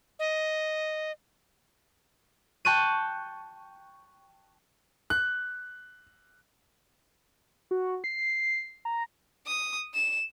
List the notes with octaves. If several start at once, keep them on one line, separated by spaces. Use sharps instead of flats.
D#5
G5 A5 C#6 F#6 D#7
F#6
F#4
C7
A#5
D#6
E7